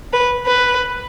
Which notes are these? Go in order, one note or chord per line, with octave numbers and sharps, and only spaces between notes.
B4
B4